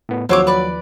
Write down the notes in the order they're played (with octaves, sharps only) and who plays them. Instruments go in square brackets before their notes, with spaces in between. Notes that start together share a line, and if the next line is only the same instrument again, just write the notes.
[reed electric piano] A2 B3
[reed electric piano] D#2 F3 [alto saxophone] F#3 [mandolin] C4 C#5 D6
[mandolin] B4 D5